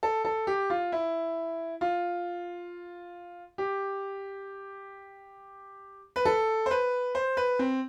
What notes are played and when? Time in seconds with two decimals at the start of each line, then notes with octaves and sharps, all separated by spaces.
0.03 A4
0.25 A4
0.47 G4
0.70 F4
0.92 E4
1.81 F4
3.58 G4
6.16 B4
6.25 A4
6.66 C5
6.71 B4
7.15 C5
7.37 B4
7.59 C4